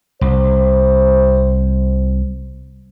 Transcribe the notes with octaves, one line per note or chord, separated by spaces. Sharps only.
C2 C5